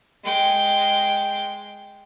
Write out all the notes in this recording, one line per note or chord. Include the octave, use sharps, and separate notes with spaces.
G#3 G5